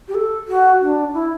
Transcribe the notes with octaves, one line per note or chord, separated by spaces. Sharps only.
G4
A4
F#4
D4
E4